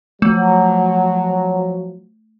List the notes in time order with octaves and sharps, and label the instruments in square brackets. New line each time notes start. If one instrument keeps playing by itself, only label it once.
[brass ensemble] F3 F#3 [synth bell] A3